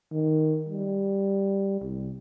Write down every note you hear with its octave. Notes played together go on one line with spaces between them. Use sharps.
D#3
G3
C2